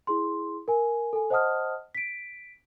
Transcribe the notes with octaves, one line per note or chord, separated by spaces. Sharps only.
E4 G#4 C6
A#4 G#5
A4 G#5
C5 D#5 F#5 A5 D#6 F6
B6 D7